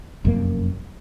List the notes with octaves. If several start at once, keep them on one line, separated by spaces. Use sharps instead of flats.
F1 F#2 C3 A#3